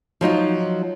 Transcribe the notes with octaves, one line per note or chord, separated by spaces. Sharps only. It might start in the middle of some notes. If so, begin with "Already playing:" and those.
F3 F#3 D#4 F4